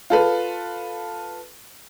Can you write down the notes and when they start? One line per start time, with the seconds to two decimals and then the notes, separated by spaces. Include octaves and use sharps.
0.10 F4 A4 B4